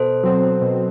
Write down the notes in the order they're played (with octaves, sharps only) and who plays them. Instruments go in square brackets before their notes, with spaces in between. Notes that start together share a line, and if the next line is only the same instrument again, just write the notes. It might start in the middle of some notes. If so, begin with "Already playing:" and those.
Already playing: [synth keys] B2 [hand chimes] A4 C5
[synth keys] F#3 C4
B2